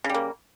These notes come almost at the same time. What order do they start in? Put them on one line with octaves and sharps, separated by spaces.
C#3 G3 A#3